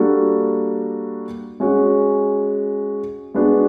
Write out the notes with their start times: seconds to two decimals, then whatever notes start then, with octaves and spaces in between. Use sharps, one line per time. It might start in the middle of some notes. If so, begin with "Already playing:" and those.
Already playing: G3 A#3 D4 F#4 A4
1.60 G#3 C#4 F#4
3.34 G#3 B3 D4 F#4